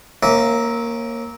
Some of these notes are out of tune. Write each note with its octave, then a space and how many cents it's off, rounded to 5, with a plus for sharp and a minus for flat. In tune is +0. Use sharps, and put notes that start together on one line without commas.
A#3 +0 C#4 -25 E5 -20